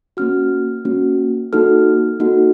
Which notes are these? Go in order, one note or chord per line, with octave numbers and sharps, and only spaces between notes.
A#3 C#4 F#4 F6
A#3 C#4 F#4
A#3 D#4 F#4 A4 F6
A#3 D#4 F#4 A4